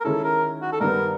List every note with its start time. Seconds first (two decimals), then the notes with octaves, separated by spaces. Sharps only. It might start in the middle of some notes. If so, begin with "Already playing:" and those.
0.01 A#4
0.04 D#3 G#3 C#4 E4 A4
0.24 A#4
0.62 F#4
0.72 A4
0.80 G2 D#3 G3 B3 A#4